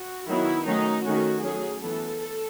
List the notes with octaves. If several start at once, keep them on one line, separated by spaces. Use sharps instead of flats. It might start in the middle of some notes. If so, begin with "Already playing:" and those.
Already playing: F#4
D#3 F#3 B3 E4
D#3 F#3 A3 C#4 D#4
D#3 A3 C#4 F#4
F#3 A3 C#4 G#4
E3 B3 A4
A4